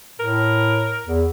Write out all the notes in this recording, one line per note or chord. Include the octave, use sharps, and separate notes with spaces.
A2 A#4
E2